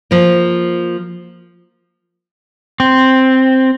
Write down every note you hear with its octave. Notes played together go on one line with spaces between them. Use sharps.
F3 A#3
C4